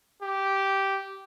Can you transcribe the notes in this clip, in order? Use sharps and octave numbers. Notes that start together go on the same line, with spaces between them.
G4